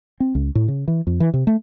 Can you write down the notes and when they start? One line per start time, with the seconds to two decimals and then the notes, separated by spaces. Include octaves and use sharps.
0.20 C4
0.35 C#2
0.55 A2
0.68 C#3
0.88 E3
1.07 F2
1.20 E3
1.34 C3
1.47 A3